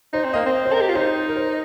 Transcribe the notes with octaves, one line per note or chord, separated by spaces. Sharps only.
D#4 C5
C4
A#3 D#5
C4
D#5
C5
A#4
G4 D#5
F4
D#4 C5
A#4
C5